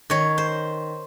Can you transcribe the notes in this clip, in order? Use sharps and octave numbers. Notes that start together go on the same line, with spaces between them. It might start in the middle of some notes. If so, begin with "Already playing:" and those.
D#3 C#5
C5